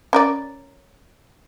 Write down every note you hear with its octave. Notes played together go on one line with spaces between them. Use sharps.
C#4 A#4 D5